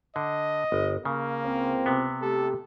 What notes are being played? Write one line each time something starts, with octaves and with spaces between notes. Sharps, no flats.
D3 D#5
G1
C#3 A#3
C#2 C4
C3 B3
A3 G4 A4